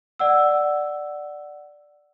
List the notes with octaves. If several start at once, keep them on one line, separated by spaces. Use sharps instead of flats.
D5 F#5 E6